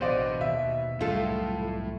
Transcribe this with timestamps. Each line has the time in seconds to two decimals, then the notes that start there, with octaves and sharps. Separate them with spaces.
0.01 A1 B2 E3 D4 C5 D5 D#5
0.41 D#2 D#3 E5
1.01 C2 F#2 A2 G3 F4 A4